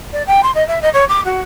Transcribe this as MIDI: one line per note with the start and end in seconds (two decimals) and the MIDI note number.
0.13 0.23 74
0.27 0.41 79
0.43 0.51 84
0.55 0.66 75
0.67 0.82 76
0.82 0.89 75
0.94 1.04 73
1.09 1.21 86
1.25 1.41 66